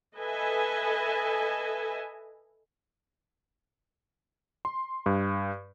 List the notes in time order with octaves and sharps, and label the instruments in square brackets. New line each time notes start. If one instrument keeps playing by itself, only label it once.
[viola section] A4 B4 D#5 E5 G#5
[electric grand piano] C6
G2